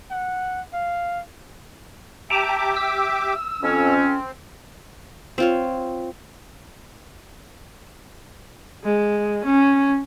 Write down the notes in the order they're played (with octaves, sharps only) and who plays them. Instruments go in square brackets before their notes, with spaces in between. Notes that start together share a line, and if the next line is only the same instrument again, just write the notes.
[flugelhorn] F#5
F5
[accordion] G4 E5 D6 [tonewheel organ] G5 A5 A#5
[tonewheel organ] E6
[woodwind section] F2 C#4
[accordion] C4
[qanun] C4 F4 C#5
[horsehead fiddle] G#3
C#4